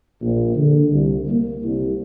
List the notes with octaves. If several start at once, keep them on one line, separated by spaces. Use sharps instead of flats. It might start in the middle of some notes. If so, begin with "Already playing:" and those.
A#1
D3
C2
A#3
C2